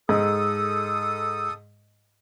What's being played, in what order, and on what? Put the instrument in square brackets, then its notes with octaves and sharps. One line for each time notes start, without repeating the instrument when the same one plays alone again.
[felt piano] G#2 [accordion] A4 D#6